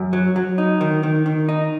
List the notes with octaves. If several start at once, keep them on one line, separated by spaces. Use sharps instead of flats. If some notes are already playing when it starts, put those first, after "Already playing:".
Already playing: F#2
F#3
F#3
D#4
D#3
D#3
D#3
D#4